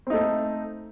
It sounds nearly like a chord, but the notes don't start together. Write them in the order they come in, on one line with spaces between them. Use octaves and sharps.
C4 D#4 A3